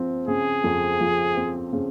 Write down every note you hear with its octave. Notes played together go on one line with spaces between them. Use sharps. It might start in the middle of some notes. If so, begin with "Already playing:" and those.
Already playing: F3 C4
C#3 G#4
F2
F3
C4
C#3